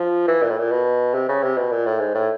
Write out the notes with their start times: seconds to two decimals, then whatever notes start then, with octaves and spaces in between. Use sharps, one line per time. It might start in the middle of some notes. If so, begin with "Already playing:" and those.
Already playing: F3
0.28 E3
0.42 A#2
0.50 A2
0.58 A#2
0.71 B2
1.15 C3
1.29 C#3
1.43 C3
1.58 B2
1.71 A#2
1.86 A2
2.00 G#2
2.14 A2